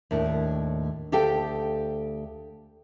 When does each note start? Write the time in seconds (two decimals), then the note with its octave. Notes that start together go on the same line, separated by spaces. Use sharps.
0.11 D#2 A2 D4
1.12 D2 G4 A4 F5 G5